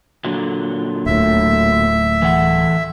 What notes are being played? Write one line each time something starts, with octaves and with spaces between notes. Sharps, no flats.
A#2 D3 F#3
D1 A2 E5
E3 A3 F#5